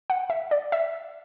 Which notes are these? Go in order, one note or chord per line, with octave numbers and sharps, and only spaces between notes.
F#5
E5
D5
E5